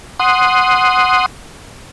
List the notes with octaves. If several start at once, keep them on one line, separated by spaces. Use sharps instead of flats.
F#5 C6 D#6